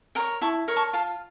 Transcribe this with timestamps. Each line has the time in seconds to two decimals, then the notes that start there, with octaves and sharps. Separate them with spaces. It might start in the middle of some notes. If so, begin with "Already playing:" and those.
0.15 A#4 C#5 G5 A#5
0.41 E4 A5 C#6
0.68 A#4 C#5
0.76 A5 C#6
0.93 F4 F5 A5